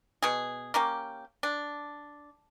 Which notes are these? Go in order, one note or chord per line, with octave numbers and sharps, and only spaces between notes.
B2 G#4
A#3 C#4 G4
D4